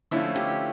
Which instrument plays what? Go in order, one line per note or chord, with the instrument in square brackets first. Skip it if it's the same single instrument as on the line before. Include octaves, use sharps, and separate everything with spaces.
[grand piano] D3 F3 A3 C#4 F4 [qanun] E4
[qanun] G4